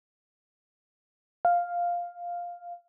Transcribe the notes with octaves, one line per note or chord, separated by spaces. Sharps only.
F5